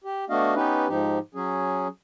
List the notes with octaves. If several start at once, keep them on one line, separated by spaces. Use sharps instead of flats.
G4
A3 B3 D4 F#4 D#5 F5
B3 C#4 D#4 G4 B4
G#2 F3 D#4 G4
F#3 C#4 G#4